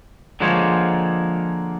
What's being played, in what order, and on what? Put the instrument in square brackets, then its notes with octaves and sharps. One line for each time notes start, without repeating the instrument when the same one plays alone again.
[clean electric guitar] D3 F3 G#3 A#3 C5 C#5